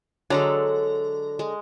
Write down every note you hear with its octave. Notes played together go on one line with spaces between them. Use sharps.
D3 F#3 G#3 A4 A#5
G#3